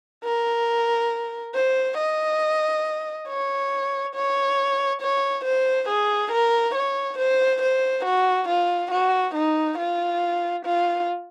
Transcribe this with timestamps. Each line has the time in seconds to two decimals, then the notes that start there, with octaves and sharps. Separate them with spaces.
0.24 A#4
1.54 C5
1.97 D#5
3.28 C#5
4.15 C#5
5.01 C#5
5.45 C5
5.88 G#4
6.31 A#4
6.74 C#5
7.18 C5
7.62 C5
8.05 F#4
8.48 F4
8.91 F#4
9.34 D#4
9.78 F4
10.65 F4